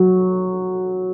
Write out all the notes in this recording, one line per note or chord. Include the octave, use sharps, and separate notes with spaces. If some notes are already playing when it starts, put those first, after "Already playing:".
Already playing: F#3 F#4